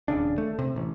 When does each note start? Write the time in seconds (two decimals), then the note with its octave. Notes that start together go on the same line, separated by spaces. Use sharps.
0.08 D#1 C2 C#3 D4
0.38 A3
0.59 C3
0.76 A1